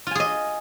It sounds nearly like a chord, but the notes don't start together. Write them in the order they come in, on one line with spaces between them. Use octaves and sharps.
F4 G#5 G#4 D#5